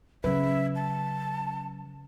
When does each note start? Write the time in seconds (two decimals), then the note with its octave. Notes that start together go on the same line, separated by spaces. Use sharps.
0.24 C#3 F#3 B4 E5
0.75 A5